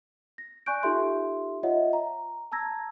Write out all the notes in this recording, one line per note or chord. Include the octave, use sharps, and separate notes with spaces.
A#6
D5 G#5 C#6 F#6 G6 D7
D#4 F4 G4 A4 E5 C6
F4 C#5 D#5 E5 F#5
A#5
A5 A#5 E6 G#6 A#6